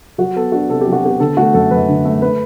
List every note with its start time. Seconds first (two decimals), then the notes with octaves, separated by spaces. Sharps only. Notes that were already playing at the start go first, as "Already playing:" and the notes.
0.18 F#3 F#4
0.36 B3 A4
0.52 D4 F#4
0.70 C3 A4
0.81 G4
0.87 F#3
0.92 F#4
1.03 B3 G4
1.20 D3 A4
1.37 A3 F#4
1.54 F#2 A4
1.71 F#2 B4
1.89 D3
2.05 A3
2.22 A3 B4